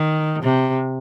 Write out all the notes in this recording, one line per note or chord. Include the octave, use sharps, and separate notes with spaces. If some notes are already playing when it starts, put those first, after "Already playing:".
Already playing: D#3
C3